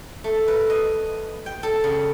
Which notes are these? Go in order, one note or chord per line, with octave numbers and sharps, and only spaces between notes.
A3
B4
D#5
G5
A4
C#3